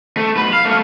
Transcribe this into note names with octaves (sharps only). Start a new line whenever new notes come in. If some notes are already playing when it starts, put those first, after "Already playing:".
A3
B1 B4
F5
A3 A#3